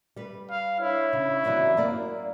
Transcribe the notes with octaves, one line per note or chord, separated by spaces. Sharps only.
G3 B4
F5
D4 E4 C#5
C#3
F#2 C3 E3 F#3 A#3 D5
F#2 A#3 D5